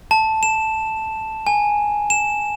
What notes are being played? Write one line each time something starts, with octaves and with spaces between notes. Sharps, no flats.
A5
E7
G#5
E7